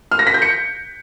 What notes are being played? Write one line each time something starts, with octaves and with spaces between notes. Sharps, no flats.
F6
A#6
B6
G6
C#7